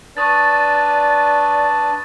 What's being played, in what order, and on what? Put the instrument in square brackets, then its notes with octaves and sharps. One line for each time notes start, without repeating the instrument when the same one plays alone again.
[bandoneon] D4 B4 A5 [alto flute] D5 [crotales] C#6 D#6 A6